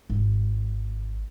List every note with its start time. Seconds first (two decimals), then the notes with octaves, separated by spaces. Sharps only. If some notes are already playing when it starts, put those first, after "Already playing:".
0.10 G#1